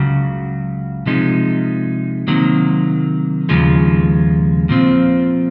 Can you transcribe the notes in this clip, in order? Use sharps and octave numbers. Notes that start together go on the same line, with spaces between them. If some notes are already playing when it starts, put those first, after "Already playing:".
Already playing: C#2 C#3 F#3
C3 F3 G#3 D#4
C3 D#3 F#3 A#3
D#2 C#3 F3 G#3
A#2 F3 C4